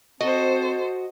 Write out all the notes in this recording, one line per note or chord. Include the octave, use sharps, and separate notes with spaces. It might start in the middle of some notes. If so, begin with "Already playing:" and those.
C4 F#4 A4 C5 D#5